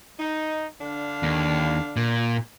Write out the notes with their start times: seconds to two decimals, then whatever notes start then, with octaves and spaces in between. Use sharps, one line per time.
0.19 D#4
0.81 D3 D4 F5
1.23 D#2
1.96 A#2